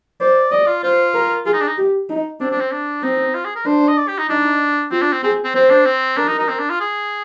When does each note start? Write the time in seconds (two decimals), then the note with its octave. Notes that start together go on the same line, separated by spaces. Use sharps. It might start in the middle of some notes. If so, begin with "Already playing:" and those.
0.20 C5 D5
0.52 D5 D#5
0.67 F4
0.83 F4 C5
1.14 A#4
1.46 F4 G#4
1.53 D#4
1.61 D4
1.68 D#4
1.77 G4
2.09 D#4
2.40 C4 D4
2.51 D4
2.61 C4
2.72 D4
3.03 C4 D#4
3.35 F4
3.45 G#4
3.56 A#4
3.66 D4 C5
3.88 D#5
3.97 D5
4.08 G4
4.19 D#4
4.29 D4 D#4
4.91 C4 F4
5.02 D4
5.13 C4
5.23 C4 G#4
5.44 C4
5.55 C4 C5
5.70 D4
5.86 C4
6.17 D4 A#4
6.28 D#4
6.39 D#4
6.49 C4
6.59 D4
6.70 F4
6.81 G#4